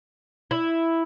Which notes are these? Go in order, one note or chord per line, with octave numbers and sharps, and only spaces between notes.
E4